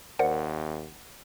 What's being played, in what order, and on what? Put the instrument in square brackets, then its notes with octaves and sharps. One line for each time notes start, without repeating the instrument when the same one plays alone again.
[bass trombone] D#2 [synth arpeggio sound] A#4 C5 D5 [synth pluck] F#5